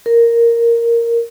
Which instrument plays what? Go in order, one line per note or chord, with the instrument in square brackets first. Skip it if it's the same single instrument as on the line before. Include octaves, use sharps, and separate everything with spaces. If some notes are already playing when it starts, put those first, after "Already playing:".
[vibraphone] A#4